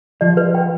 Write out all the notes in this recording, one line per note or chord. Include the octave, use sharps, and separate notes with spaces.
F3 D5
B4
G5